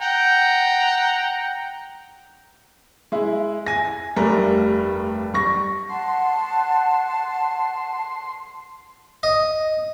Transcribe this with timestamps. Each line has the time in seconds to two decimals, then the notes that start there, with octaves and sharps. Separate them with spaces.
0.01 F#5 G5 A#5
3.12 G#3 E4
3.67 G#5 A#6
4.16 F1 G2 G3 A3 A#4 A#5
5.34 G3 C#6 A#6
5.89 F#5 A5 C6
9.23 D#5